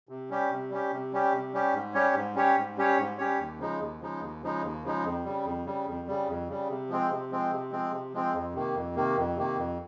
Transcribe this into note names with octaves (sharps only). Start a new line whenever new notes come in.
C3
G3 C#4 G4
C3
G3 C#4 G4
C3
G3 C#4 G4
C3
G3 C#4 G4
G#2
G3 C#4 G4 C#5
G#2
G3 C#4 G4 C#5
G#2
G3 C#4 G4 C#5
G#2
G3 C#4 G4 C#5
D#2
C#3 F3 G#3 D#4
D#2
C#3 F3 G#3 D#4
D#2
C#3 F3 G#3 D#4
D#2
C#3 F3 G#3 D#4
F2
C#3 G3
F2
C#3 G3
F2
C#3 G3
F2
C#3 G3
C3
F3 G#3 C4
C3
F3 G#3 C4
C3
F3 G#3 C4
C3
F3 G#3 C4
F2
C3 D#3 A#3
F2
C3 D#3 A#3
F2
C3 D#3 A#3
F2